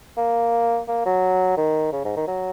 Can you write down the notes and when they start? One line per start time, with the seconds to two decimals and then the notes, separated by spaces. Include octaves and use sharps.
0.17 A#3
0.88 A#3
1.06 F#3
1.57 D#3
1.92 C#3
2.05 G#2
2.17 D#3
2.27 F#3